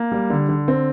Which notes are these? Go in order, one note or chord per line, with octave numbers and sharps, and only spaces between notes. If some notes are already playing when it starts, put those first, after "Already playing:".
Already playing: A#3
G3
D3
D3
C4